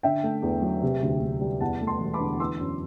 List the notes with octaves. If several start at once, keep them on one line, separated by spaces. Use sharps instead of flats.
D3 E5 G5
A3
E2
F#3
C3
D2
D2
G3
E2 F#5 A5
A3
A5 C6
E1
B5 D6
D3
E3 C6 E6
F#2